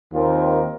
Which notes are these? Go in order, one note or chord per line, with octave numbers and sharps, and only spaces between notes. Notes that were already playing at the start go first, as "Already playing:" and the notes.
D#2 D#3 C4 F4 A#4